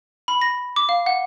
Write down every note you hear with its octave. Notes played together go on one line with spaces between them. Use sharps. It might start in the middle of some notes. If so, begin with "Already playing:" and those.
B5
A#6
D6
F5
F#5